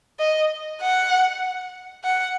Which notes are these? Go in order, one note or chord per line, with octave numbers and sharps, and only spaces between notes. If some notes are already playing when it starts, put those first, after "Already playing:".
D#5
F#5
F#5